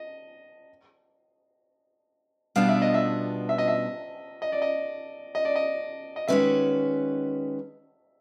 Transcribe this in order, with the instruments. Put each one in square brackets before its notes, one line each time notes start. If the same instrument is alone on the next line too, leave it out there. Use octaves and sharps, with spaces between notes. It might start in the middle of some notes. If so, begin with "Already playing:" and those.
Already playing: [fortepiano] D#5
[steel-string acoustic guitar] B2 G3 B3 D4 F4 [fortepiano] F5
[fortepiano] E5
D#5
E5
E5
D#5
E5
D#5
D5
D#5
D#5
D5
D#5
D#5
[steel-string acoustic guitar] D#3 G#3 C#4 F#4 B4 [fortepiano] E5